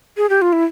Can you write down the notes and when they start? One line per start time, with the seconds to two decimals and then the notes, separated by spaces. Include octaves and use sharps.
0.17 G#4
0.30 G4
0.42 F4
0.53 E4